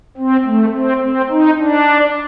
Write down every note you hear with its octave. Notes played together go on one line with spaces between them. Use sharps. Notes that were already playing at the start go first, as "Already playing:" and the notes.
C4
A3
C4
C4
D#4
D4